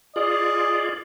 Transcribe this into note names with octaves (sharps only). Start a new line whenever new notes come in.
F4 G#4 D5 D#5